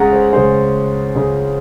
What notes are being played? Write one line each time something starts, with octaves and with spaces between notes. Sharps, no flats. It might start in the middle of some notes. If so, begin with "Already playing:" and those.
Already playing: C#2 C#3 G#3 C#4 F#5 A#5
C5
C#2 C#3 G#3 C#4 C5
C#2 C#3 G#3 C#4